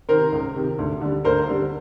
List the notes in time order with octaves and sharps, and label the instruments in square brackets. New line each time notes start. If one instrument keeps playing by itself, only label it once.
[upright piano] C3 D#3 A#4 C5
C#2
C3 D#3
D2
D3 G3
D2 A#4 C5
D3 G3